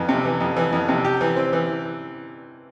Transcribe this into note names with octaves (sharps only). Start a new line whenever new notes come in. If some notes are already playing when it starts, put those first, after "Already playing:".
Already playing: F2 E3
C3
E3
F2
E3
F2
C3
G4
E3
C4
E3